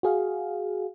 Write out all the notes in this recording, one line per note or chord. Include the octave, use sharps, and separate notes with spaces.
F#4 G#4 F5